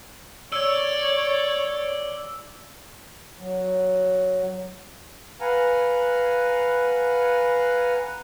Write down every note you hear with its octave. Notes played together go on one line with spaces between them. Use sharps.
C#5 D5 E6
F#3
B4 F5 F#5 G#5 A#5